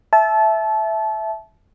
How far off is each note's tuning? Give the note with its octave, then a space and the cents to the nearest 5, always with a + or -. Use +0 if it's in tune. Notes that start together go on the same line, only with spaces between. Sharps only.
E5 +0 A5 -25